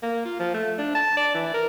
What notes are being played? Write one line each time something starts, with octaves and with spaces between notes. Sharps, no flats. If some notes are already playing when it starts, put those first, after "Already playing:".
A#3
F4
F3
A3
D4
A5
D5
E3
A#4